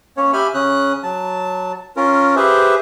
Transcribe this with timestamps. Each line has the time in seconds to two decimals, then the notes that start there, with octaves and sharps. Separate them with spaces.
0.17 A#3 C#4 C#5
0.33 G4 E5 G#5 B5 F6
0.54 C#3 C#4 D#6 F#6
1.03 F#3 A5
1.96 C#4 F4 A#4
2.36 G4 G#4 B4 C5 E5